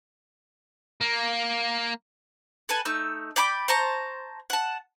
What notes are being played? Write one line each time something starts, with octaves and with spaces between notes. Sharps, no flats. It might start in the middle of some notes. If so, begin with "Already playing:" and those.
A#3
A4 B4 G#5 A5
A3 D#4 E6
D5 G5 B5 D6
C5 A5 A#5 C#6
F#5 A5